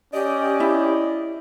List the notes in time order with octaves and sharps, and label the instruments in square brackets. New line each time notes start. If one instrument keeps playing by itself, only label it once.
[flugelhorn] C#4 [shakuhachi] G4 [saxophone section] D5 D#5
[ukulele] E4